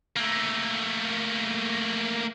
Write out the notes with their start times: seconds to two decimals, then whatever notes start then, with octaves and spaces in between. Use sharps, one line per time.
0.17 A3 A#3